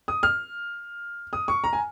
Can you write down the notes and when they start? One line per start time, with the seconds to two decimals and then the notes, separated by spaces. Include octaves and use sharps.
0.08 D#6
0.23 F6
1.33 D#6
1.48 C#6
1.64 A#5
1.73 G#5